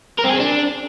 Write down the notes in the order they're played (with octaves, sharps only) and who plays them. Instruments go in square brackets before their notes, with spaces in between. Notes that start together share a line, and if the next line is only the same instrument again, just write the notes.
[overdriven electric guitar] A#4
C4
G#4
C4
D4